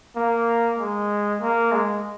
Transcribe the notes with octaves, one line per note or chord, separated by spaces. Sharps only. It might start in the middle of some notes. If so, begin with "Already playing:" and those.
A#3
G#3
A#3
G#3